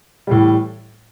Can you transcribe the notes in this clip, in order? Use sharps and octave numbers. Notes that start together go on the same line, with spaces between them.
A2 E3 G3